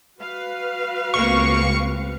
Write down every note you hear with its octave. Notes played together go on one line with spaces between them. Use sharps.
F#4 B4 F5
C#2 A3 A#3 C4 C#6